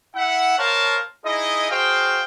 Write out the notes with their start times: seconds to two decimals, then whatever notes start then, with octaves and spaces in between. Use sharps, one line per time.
0.15 E4 E5 F#5
0.59 A#4 C5 C#5 F5 A5
1.26 D#4 E4 G#4 D#5
1.71 F#4 G#4 C5 F5 G5